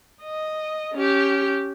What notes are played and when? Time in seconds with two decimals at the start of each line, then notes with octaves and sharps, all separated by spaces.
0.22 D#5
0.94 C#4 G4